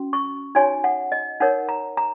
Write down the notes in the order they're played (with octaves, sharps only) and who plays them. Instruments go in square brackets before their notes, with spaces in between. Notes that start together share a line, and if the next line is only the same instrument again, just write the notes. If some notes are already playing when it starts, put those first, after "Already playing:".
Already playing: [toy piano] C#4 F#4
C#6
D#4 F#4 C#5 G#5
F#5
D#5
D#4 A#4 C#5 F#5
A#5
A#5